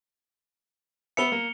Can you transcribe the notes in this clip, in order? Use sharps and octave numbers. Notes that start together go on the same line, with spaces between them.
B3 B4 E5 C#7 F7 G7
A#3